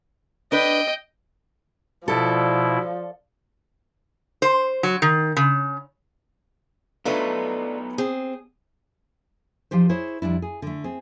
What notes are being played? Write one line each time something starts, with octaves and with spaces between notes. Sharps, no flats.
D4 B4 D#5 G5
B2 F3 E4 A4 D5
C5
F#3
D#3
C#3
F#3 A3 B3 D4 D#4 F4 A4 B4
C4 G#4
F3 D#4 G4 C5
E4 G#4 C5 C#5
F2 G3 D4 E4
G#4
D3 A3
C4 G#4